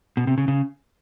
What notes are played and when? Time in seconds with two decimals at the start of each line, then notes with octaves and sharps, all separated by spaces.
0.17 B2
0.27 C3
0.38 C#3
0.48 C#3